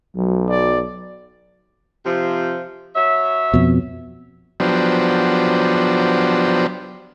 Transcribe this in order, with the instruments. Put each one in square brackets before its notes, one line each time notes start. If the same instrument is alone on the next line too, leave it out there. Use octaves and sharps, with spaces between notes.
[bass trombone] B1 [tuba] F#3
[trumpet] D5
[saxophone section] C3 F3
F#3 C#5 E5
[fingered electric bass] F2 B2
[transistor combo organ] F3 F#3 B3 D4 G4 C5